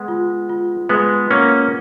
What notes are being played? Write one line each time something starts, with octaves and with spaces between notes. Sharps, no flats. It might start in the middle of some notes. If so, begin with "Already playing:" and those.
Already playing: G#3 B3 B4 F#5
F4
F4
G#3 B3 B4
A#3 C#4 F#5